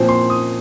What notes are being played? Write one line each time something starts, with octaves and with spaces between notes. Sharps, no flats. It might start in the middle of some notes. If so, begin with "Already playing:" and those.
Already playing: A#2 F3 C4 C5
C6
D#6